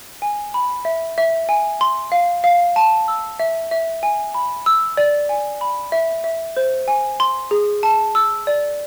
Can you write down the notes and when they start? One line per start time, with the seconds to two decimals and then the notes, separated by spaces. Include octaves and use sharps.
0.22 G#5
0.54 B5
0.85 E5
1.18 E5
1.49 G#5
1.81 C6
2.12 F5
2.44 F5
2.76 A5
3.08 E6
3.40 E5
3.71 E5
4.03 G#5
4.34 B5
4.66 E6
4.97 D5
5.29 G#5
5.61 B5
5.92 E5
6.24 E5
6.57 C5
6.88 G#5
7.20 C6
7.51 G#4
7.83 A5
8.15 E6
8.47 D5